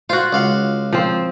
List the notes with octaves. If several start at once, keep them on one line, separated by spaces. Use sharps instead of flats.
F4 F#4 C5
C#2 F5 F#5
F3 C4